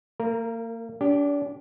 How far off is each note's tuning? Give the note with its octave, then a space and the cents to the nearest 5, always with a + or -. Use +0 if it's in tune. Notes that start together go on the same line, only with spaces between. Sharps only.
A#3 -35 A#4 +0
D4 -35 G4 +0